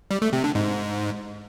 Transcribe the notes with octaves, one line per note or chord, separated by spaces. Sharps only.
G3
A3
C3
D3
G#2